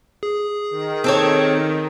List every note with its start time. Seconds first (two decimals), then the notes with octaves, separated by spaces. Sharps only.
0.23 G#4
0.70 D#3
1.04 D#3 C4 A4 C#5